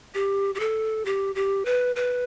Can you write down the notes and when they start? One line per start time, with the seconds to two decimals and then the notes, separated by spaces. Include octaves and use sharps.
0.15 G4
0.55 G4
0.60 A4
1.05 G4
1.35 G4
1.65 B4
1.96 B4